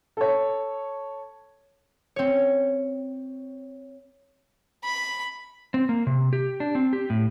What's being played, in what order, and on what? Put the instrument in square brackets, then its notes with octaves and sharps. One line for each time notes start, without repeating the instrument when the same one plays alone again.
[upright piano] A4 C#5
[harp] C4 C#5
[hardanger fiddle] B5
[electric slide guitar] C4
A#3
C3
G4
D4
C4
G4
A2